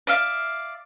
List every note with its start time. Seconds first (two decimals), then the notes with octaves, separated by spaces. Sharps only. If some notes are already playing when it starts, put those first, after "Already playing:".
0.07 D5 E5 F5